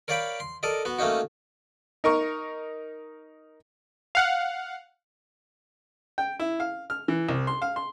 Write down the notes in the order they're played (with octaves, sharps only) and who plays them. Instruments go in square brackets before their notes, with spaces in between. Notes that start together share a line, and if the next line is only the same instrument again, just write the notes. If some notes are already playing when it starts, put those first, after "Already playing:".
[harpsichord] A#4 C#5 D5 F5 G5 B5
C6
A4 A#4 D5 D#5
B3 F#4
A3 A#3 C#4 D#4 F#4
[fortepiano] D#4 A#4 C#6
[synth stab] F5 F#5
[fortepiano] G5
E4
F5
F6
E3
C2
C6
F5
C6